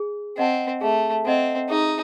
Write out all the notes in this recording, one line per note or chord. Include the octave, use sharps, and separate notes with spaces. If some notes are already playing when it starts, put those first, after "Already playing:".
Already playing: G#4
C4 D#5 F#5 A5
A3 G#4
C4 D#5 F#5 A5
D#4 G#4